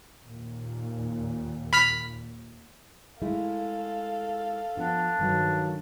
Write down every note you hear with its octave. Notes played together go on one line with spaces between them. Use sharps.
D#2 A#2
B5 F6 B6
G#3 A3 E4 A4 F5
F3 B3 D4
G2 D#3 F#3